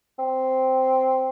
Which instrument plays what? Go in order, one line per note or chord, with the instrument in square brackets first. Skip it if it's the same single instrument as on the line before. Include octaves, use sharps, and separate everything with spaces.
[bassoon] C4